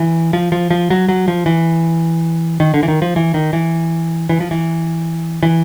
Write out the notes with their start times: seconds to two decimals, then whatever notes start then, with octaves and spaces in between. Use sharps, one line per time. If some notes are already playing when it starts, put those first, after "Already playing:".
Already playing: E3
0.33 F3
0.52 F3
0.71 F3
0.90 F#3
1.09 F#3
1.28 F3
1.46 E3
2.60 D#3
2.74 D3
2.83 E3
2.88 D#3
3.02 F3
3.16 E3
3.34 D#3
3.53 E3
4.29 E3
4.40 F3
4.51 E3
5.43 E3